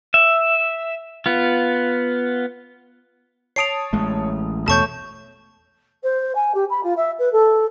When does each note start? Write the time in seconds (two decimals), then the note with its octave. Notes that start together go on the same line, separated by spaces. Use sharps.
0.14 E5
1.26 B3 F4
3.56 C#5 A5 D#6 C7 D7 F7
3.93 A1 G#3 A3
4.68 E2 B2 A3 C#5 A5 C#6 G6
6.03 C5
6.35 G#5
6.54 G4
6.69 B5
6.83 F4
6.97 E5
7.19 B4
7.32 A4